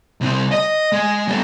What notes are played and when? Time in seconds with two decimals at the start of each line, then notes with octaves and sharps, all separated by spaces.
0.21 C2 C4
0.51 D#5
0.92 G#3
1.28 G3 B3